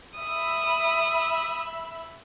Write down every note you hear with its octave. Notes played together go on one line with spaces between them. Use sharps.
E5 B5 D#6